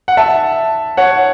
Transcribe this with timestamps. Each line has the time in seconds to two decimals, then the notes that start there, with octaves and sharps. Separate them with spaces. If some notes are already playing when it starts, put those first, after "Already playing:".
0.08 F#5
0.17 E5 A5
0.97 C#5 F#5